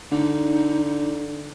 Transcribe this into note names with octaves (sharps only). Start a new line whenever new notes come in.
D3 D#4